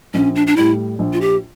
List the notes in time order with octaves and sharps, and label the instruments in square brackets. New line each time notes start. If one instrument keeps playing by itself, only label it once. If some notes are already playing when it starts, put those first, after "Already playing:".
[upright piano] A#1 [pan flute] C#4
[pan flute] D4
D4
[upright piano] A2 G3 [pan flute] E4
[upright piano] A#1
[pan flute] F4
G4